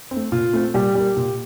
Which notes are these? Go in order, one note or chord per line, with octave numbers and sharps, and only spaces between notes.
C4
A3
A#2 F4
A3 C4
A#2 G3 G4
G3 A#3
A#2